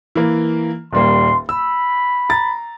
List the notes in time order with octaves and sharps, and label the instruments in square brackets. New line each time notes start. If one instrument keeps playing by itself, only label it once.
[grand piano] E3 A#3
[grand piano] D#1 G3 A#3 [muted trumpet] C6
[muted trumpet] B5 [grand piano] E6
[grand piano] A#5 A6